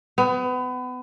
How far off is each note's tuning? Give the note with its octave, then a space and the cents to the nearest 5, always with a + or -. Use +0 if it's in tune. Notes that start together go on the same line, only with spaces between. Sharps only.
B3 +30